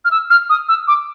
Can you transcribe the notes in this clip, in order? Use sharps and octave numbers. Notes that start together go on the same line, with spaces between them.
F6
E6
F6
D#6
E6
D6